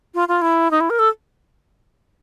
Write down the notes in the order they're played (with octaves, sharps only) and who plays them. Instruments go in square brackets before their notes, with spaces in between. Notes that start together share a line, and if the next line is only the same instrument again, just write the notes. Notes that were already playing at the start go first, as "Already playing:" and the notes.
[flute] F4
F4
E4
D#4
E4
A#4
A4